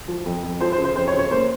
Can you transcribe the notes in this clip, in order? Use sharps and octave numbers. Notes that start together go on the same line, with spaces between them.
F3
F2
F2
F3 C5
C5
C#3
C5
F2 C5
C#5
C#3
C#5
A#3 C5